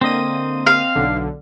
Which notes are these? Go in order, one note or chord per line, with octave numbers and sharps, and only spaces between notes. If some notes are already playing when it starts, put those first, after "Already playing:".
D3 A#3 C4 D#5 D#7
F5
B1 D3